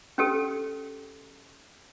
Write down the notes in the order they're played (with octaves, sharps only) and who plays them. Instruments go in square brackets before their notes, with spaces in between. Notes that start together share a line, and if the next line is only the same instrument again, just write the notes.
[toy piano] C#4 G4 A4